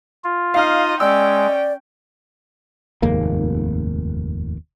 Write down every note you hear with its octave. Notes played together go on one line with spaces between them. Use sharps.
F4
D#4 D#5 F5 F6
G#3 C#4 D5 G5 E6
F1 D#2 G#2 A#3